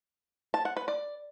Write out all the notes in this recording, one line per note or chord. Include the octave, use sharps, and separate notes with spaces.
A5
F#5
B4
D5